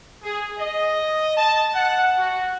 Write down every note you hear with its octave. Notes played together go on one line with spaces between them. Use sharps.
G#4
D#5
A5
F#5
F#4